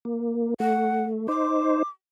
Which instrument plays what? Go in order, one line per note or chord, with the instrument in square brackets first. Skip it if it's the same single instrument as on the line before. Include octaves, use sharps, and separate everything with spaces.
[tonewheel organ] A#3
[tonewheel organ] A3 [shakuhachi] F#5
[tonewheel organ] D#4 C5 [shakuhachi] D6